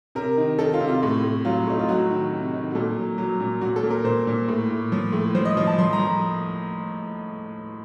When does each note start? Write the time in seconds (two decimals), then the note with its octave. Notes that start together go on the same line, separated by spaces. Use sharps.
0.15 C3 A#4
0.37 D#3
0.58 D#3 A4
0.74 F4
0.80 C3
0.88 F4
1.03 A2
1.23 A2
1.45 F#3 F4
1.67 A2 D#4
1.79 F4
1.89 F#3 F#4
2.10 D#3
2.32 C3
2.53 D#3
2.71 F#4
2.75 A#2 A4
2.96 F#3
3.18 F#3
3.40 A#2
3.61 A#2 F#4
3.76 A4
3.83 A#2
3.91 A#4
4.04 A#2 C5
4.27 A#2
4.48 A2
4.70 A2
4.92 F3
5.13 A2
5.35 F3 C5
5.45 D#5
5.57 F3
5.67 A5
5.78 F3 C6
5.93 A#5
5.99 F3